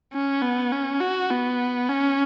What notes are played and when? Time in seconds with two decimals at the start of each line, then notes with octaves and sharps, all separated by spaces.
0.13 C#4
0.42 B3
0.72 C#4
1.01 F#4
1.30 B3
1.89 C#4